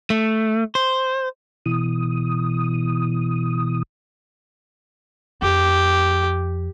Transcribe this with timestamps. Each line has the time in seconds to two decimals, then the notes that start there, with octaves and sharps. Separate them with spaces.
0.10 A3
0.75 C5
1.66 B2 E3 D#6
5.42 F2 G4